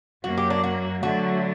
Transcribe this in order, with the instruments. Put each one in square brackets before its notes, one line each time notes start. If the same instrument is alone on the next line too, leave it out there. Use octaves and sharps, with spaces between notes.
[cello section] F#2 F#3 A#3 [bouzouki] F#4
[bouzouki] G4
D4
F#4
[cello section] D3 F#3 A3 [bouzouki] F#4